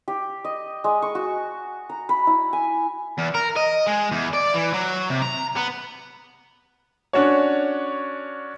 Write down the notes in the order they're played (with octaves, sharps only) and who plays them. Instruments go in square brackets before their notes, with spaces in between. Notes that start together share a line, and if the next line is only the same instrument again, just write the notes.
[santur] G4
D#5
G#3
C#6
F#4
A#5
B5
E4
G#5
[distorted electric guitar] E2
A#4
D#5
G#3
E2
D5
E3
F#3
C3
A#5
B3
[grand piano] C#4 D4 F#4 C#5